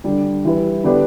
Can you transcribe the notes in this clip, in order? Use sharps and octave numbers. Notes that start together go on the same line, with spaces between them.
D3 G3 D4 G4
E3 G3 E4 B4
D3 B3 D4 G4 B4